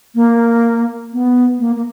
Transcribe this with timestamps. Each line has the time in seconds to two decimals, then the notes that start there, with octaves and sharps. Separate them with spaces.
0.15 A#3
1.13 B3
1.59 A#3
1.76 A#3